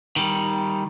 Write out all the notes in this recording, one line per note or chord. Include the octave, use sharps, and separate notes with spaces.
D#3 G3